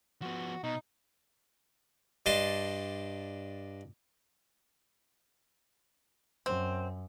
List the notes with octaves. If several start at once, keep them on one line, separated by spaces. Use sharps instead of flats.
F3 B3 F#4
B2 D#4
G2 D4 D#5 A5 C6
F#2 C4